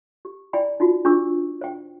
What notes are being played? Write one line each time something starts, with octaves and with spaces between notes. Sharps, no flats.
G4
E4 D5 G5 G#5 B5
D#4 F4 F#4
D4 F4 G#4 C#6 D6 E6
C5 G5